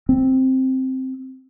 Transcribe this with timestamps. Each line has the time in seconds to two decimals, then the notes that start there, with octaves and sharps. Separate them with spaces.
0.09 C4